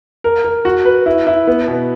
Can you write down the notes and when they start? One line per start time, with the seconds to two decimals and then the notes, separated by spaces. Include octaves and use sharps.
0.24 A#4
0.44 A#4
0.65 F#4
0.85 B4
1.06 E4
1.27 E4
1.47 B3
1.68 B2